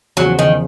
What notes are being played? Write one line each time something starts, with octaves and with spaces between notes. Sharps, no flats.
E2 C#3 F3 F#3
D#3